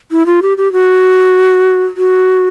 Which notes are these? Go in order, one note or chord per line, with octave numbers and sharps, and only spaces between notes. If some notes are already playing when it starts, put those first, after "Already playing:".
E4
F4
G4
G4
F#4
F#4